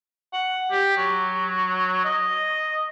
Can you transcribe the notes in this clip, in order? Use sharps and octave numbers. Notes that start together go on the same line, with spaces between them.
F#5
G4
F#3
D#5